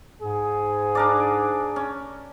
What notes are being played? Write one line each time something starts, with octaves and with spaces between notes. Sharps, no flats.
G#2 G#4
D4 A#4 D5
C#4